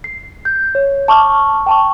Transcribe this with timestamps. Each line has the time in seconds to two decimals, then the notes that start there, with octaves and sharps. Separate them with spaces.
0.04 C7
0.45 G6
0.75 C#5
1.08 A5 C#6 D6 F6
1.66 G5 A5 C#6